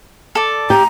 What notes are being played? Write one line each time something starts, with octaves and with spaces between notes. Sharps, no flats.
A4 D5
G4 A#5